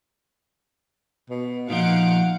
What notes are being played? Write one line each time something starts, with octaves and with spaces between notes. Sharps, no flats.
B2
A#2 F3 D#4 F5 F#5 D7